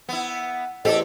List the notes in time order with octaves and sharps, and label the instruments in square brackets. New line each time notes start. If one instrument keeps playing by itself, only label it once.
[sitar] B3 E4
[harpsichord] A1 E2 [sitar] C4 G4 [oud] A4 [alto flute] D#5